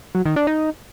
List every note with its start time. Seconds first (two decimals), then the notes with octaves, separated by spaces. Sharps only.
0.15 F#3
0.25 D#3
0.36 D4
0.47 D#4